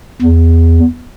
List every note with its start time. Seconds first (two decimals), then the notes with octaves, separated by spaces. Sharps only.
0.22 E2